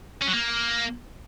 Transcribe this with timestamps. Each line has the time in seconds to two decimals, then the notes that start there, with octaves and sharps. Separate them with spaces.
0.21 C#4
0.27 F#3
0.33 A#3